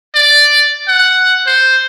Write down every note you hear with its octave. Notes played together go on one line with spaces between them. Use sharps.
D5
F#5
C5